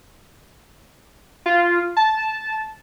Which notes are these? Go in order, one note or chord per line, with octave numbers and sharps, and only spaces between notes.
F4
A5